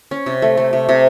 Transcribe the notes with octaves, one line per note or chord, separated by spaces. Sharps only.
C#4
C3
A3
A3
C3
C3